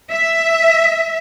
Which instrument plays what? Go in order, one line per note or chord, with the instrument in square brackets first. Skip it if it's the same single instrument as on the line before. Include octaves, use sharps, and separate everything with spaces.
[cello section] E5